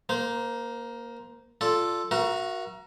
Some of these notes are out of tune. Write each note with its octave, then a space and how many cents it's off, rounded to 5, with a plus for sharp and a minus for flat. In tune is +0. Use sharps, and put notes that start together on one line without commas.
A#3 +10 C5 -20
F4 +0 A4 +0 D5 +0
F#4 -10 A#4 +20 E5 +45